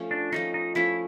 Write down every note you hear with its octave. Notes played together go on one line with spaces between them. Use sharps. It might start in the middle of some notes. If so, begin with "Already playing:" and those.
Already playing: F3 A3 C#4
D4
F3 A3 C#4 D#4
D#4
F3 A3 C#4 E4